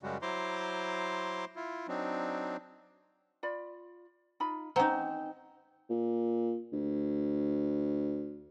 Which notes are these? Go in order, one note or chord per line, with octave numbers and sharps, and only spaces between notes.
F#2 C#3 G3 G#3 F#4
F#3 E4 C5 A#5 C6 D6
E4 F4
F#3 C4 D4 D#4
F4 D5 B5
D#4 F4 B5
C4 C#4 D#4 F#5 A#5
A#2
D2